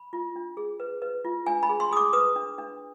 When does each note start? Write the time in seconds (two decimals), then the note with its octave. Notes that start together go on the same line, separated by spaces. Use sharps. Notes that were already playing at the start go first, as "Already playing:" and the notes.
Already playing: B5
0.13 F4
0.36 D4
0.57 G#4
0.80 B4
1.02 B4
1.25 F4
1.46 D4 G#5
1.63 B5
1.69 G#4
1.80 C6
1.91 G#4 D#6
1.97 D6
2.13 B4 D#6
2.36 D4
2.58 D4